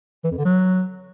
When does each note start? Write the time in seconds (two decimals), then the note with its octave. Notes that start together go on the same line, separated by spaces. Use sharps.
0.24 E3
0.31 F2
0.38 D3
0.45 F#3